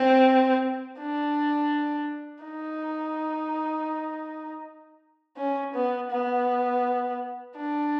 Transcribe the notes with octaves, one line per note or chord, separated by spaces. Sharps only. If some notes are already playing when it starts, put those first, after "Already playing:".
Already playing: C4
D4
D#4
C#4
B3
B3
D4